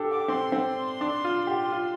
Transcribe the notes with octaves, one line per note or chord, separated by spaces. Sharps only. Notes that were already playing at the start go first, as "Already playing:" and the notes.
Already playing: D4 G4 A4
G4 D6
C4 C6
C4
D4
F4
G4
F4